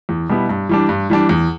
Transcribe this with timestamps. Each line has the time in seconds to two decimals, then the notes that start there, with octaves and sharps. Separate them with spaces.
0.09 E2
0.29 B2 G3 B3 E4
0.49 G2
0.69 E3 G3 D4
0.89 G2
1.10 E3 G3 D4
1.29 E2